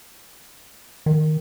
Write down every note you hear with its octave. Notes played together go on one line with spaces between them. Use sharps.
D#3